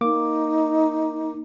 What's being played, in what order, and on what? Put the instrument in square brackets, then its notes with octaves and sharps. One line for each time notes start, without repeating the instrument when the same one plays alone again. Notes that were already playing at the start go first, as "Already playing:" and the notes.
[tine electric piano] A#3 D6 [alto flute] D#4